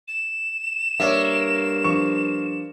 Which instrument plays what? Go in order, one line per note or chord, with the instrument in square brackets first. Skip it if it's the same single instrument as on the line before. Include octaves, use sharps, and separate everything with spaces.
[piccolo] E7
[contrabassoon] G2 [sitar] A#3 [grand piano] C#5 D5 E5
[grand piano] F3 D4 C#6